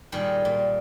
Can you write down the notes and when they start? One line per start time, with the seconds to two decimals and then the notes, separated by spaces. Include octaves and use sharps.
0.12 A#2 D#3 G3 G#3
0.45 A#2